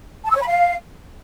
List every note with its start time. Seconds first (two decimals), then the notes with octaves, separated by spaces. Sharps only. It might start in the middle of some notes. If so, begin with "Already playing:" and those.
0.25 A5
0.30 E6
0.36 C#5
0.42 B5
0.47 F5